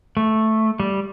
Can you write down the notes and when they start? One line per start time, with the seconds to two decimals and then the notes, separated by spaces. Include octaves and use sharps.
0.17 A3
0.80 G3